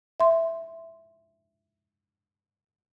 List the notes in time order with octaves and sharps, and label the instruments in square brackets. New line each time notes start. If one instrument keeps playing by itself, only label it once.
[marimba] E5 C6